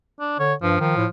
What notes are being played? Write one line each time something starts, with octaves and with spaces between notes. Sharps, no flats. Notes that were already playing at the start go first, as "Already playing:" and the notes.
D4
D3 C#5
G2 F3
D#3 F3
A2